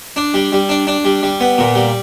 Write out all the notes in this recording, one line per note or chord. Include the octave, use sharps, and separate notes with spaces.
D4
G3
G3
D4
D4
G3
G3
B3
A#2
G3